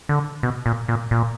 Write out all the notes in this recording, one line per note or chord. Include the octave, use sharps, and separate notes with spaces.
D3
B2
A#2
A#2
A#2